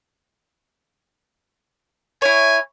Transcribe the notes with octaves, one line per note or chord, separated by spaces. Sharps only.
E4 C#5 G#5